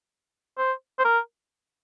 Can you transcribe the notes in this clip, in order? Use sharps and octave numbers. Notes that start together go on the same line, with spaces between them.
C5
C5
A#4